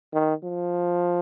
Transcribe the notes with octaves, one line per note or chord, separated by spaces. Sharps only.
D#3
F3